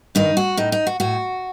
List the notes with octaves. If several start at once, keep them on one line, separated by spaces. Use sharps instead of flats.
G2 D#3 D#4
F#4
A2 D#4
D#4
F#4
A2 F#4